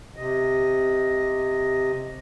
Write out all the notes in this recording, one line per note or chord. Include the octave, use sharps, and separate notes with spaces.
C3 D#5